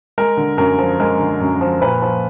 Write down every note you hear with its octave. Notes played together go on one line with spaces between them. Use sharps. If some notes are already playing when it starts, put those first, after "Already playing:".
G#3 A#4
D3
F#2 A#4
F3
G#3 A#4
D3
F#2
F3
A#2 B4
F3